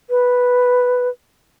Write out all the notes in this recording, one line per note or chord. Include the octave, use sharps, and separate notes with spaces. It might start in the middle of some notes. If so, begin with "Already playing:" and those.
B4